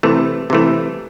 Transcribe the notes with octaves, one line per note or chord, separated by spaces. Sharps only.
C3 E3 A3
C3 E3 A3